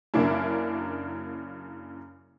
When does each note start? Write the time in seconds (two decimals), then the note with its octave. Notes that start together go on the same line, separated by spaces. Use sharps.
0.14 F#2 C#3 F#3 A#3 D4 E4